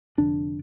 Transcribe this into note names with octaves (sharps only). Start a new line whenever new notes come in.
F1 F2 D3 D4